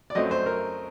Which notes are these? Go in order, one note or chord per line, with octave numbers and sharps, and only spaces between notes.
D5
F#2 F#3 A3 C4 D#5
C5
A#4